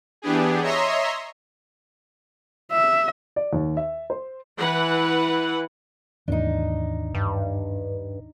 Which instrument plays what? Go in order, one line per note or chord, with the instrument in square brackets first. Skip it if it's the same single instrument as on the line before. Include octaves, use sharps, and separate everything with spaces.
[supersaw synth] E3 B3 D4 G4 G#4
C#5 D#5 E5 A#5 C6
[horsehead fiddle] E5
[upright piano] D5
D#2
E5
C5
[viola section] E3 B4 F#5
[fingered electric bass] D#2 G#2 E3 [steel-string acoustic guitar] D4 D#4
[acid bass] G2